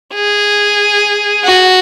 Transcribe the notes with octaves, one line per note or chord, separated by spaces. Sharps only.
G#4
F#4